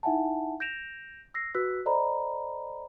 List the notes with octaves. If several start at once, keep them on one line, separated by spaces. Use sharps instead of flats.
D#4 E4 E5 F#5 G#5 A5
G6 A#6 D7 E7 F7
E6 A#6 C7
F#4 B4 E6 F#6 B6
A4 C5 D5 D#5 A#5 B5